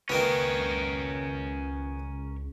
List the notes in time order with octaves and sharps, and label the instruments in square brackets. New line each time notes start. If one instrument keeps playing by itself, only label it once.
[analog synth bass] C#2 [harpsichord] D#3 A#3 B3 [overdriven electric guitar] C#4 A#4